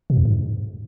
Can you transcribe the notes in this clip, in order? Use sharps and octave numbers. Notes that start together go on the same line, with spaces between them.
B2
E2
G#2